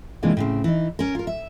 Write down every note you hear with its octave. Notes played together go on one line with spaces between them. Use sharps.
C3 E3 G#3 A#3 D4 F4
A2 C#3 C4
E3 D#4
C#4 A#4
F4 A#4
E5